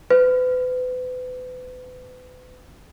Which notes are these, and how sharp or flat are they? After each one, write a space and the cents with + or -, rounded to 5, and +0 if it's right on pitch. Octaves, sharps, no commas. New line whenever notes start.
B4 +35